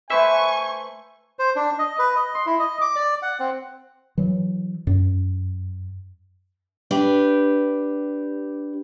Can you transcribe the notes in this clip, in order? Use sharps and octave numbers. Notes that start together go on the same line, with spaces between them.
A3 B4 C5 E5 G#5 C#6
C5
D4
D#5
B4
D#5
C6
E4
D#5
D6
D5
F#5
C4
E3 F#3
F#2
D4 G4 B4